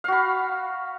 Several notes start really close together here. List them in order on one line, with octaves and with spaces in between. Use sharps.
F5 F#4 B5